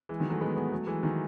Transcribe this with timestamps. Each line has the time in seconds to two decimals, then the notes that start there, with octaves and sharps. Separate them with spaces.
0.09 E3 G#3
0.20 D#3 F#3
0.30 F#3 A3
0.41 G#3 B3
0.56 G#3 B3
0.72 F#3 A3
0.87 E3 G#3
1.03 D#3 F#3